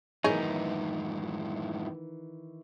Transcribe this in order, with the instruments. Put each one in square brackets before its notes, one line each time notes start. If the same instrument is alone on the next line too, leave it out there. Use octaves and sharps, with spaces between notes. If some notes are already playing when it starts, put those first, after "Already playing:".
[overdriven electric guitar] F#2 A2 [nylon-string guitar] D#3 E3 B3 [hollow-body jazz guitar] D#4 [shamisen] G#4 C#5